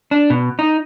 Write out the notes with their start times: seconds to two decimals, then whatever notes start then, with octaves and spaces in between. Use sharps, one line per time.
0.11 D4
0.30 B2
0.59 D#4